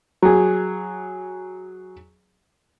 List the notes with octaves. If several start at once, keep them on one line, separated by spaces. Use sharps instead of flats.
F#3 G#4